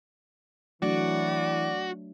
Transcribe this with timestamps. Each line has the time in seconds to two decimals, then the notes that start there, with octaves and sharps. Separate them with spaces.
0.82 E3 F#3 A3 D4 F#4 D5